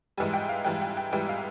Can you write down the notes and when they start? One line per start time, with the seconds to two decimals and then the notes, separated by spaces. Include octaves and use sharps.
0.18 G#2 E3 G3 G#5
0.33 G5
0.49 F5
0.65 G#2 E3 G3 G5
0.82 G5
0.97 G5
1.12 G#2 E3 G3 G5
1.29 F5